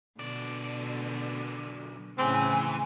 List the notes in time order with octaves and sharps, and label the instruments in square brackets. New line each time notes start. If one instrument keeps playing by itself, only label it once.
[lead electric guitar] B1 D5 [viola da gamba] B2 D3
[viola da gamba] A2 C#3 [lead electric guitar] E3 [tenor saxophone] C4 [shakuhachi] G#5